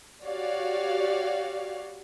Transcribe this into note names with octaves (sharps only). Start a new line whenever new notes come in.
F#4 G4 C#5 D5 F5